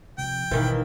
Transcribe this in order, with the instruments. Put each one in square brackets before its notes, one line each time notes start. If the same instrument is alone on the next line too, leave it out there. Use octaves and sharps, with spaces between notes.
[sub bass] C3 [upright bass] F3 [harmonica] G5
[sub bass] G#1 [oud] D#2 D#3 E3 [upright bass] B2